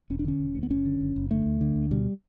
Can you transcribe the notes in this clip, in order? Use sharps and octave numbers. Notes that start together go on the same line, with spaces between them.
E1 C#4
D4
D3 C#4
E1
D2
B3
F#1 C#4
D3
F#1
F#1
D3 A3
D2
D3
D2
B2 G3